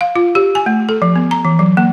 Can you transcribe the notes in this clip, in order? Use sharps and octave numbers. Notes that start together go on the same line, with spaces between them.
F5
F4
G4
G#5
A3
A4
F3
B3
A#5
E3
F#3
A#3